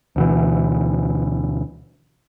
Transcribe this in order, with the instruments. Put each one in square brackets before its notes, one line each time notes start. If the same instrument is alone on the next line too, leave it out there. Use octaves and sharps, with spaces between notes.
[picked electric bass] D2 B2 E3